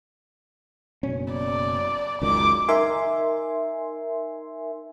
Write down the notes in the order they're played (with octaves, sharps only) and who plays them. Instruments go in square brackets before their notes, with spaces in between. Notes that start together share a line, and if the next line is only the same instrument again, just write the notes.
[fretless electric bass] F#1 B2 C#4
[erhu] D5
[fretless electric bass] C#2 F#2 D#3 [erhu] D6
[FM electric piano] D#4 A#4 E5 G#5 C6